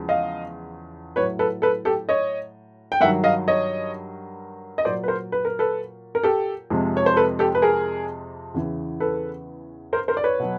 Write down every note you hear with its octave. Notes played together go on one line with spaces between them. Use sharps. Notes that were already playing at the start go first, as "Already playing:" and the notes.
Already playing: E2 C#3 F3 G#3
D#5 F5
A2 F#3 B4 C#5
A4 B4
A4 B4
G4 A4
C#5 D#5
G5
G2 D#3 F#3 E5 F#5
D#5 F5
C#5 D#5
D#5
A#2 F#3 C5 D5
B4
A#4 C5
B4
A#4
A4 B4
A#4
G4 A4
F2 C3 F3 G#3
C#5
C5
A4 B4
G4 A4
B4
G#4 A#4
E2 C#3 E3
A4 B4
A#4 C5
A#4 C5
D5
B4 C#5
B2 F#3